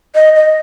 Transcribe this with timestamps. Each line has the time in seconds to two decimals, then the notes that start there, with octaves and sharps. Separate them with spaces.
0.15 D#5
0.36 D#5